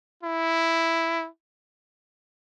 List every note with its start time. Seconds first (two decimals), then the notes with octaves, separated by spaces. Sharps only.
0.23 E4